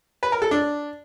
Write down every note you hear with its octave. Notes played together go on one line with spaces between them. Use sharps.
B4
A#4
A4
D4